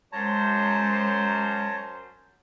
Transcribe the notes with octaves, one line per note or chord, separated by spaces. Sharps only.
F#2 G#3 C5 C#5 A5 A#5